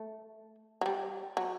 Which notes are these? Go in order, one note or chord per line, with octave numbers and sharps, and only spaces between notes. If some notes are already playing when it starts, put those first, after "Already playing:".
Already playing: A3
F#3
G3
F#3